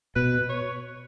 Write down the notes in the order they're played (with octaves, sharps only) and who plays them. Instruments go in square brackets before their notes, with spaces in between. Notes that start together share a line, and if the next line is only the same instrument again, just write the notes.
[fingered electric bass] B2 [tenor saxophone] B4
[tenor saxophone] C#5